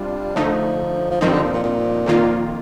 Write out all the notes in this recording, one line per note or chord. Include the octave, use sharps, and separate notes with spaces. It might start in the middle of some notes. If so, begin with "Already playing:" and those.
Already playing: C3 G3 D4 F4
D3 F3 A3 D#4
F3
G2 D#3 F3 C4 D#4
D3
A#2
A#2
A#2
F2 D#3 A#3 F4